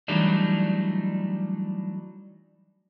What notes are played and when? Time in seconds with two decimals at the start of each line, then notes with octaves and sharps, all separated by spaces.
0.08 E3 F#3 G3 A3 D4 D#4